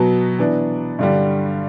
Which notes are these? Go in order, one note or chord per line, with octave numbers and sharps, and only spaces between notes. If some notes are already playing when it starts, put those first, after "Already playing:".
Already playing: B2 F#3 B3
E3 B3 D4
G2 D3 G3